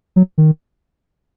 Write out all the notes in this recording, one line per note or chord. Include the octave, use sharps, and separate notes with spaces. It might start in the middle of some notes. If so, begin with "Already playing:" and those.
F#3
D#3